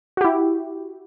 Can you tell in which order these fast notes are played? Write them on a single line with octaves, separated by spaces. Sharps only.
F#4 G4 E4